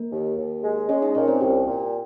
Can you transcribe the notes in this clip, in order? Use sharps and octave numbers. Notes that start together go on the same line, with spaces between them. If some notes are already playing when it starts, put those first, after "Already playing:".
Already playing: A#3 A#4
D#2
D#2
G#3
G#3 C#4 C#5
D#4 D#5
A#2 C#4 C#5
C4 C5
C2 G4 G5
A#2